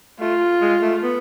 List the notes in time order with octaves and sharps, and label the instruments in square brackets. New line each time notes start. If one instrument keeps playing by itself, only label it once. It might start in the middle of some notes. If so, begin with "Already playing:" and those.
[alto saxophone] A3 [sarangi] F4
[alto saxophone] G#3
A3
B3